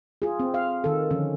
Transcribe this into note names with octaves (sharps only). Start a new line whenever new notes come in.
F4 G#4
C4
F5
D#3 A4
D3 D#3 F3 C#4